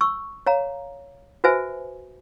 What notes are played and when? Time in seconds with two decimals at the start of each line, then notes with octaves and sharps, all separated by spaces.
0.01 C#6 E6
0.46 C#5 F5 A#5
1.44 F#4 B4 C5 E5 G#5